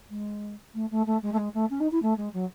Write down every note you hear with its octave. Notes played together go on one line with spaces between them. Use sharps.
G#3
A3
A3
A3
G#3
A3
G#3
A3
C#4
D#4
E4
A3
G#3
F#3